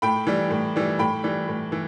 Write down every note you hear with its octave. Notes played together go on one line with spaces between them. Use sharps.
A2 G5 B5
E3 G3
A2
E3 G3
A2 G5 B5
E3 G3
A2
E3